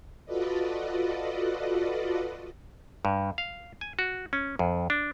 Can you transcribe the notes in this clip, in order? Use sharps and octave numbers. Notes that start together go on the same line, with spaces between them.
F4 F#4 A4 B4 D5 D#5
G2
F5
G#5
F#4
C#4
F2
D4